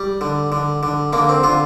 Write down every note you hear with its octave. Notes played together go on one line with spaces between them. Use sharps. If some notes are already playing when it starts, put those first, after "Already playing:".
Already playing: G3
D3
D3
D3
D3 A#3
C4
D3 F4